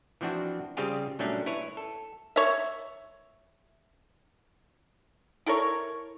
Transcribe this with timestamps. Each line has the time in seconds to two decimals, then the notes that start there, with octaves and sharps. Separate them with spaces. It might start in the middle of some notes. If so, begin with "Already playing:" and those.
0.21 E3 F3 C4 D4 F#4
0.77 C#3 G3 C4 F4 G4 G#4
1.19 A#2 F#3 G3 A3 C#4 D4
1.46 E4 B4 C#5
1.77 A4
2.36 C#5 E5
5.46 E4 A4 A#4 C#5